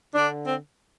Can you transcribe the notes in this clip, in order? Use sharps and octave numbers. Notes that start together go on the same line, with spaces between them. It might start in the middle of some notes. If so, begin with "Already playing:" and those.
D3 D4
C4